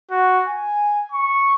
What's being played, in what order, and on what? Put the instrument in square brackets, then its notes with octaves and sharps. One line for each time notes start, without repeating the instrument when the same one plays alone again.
[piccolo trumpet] F#4
G#5
C#6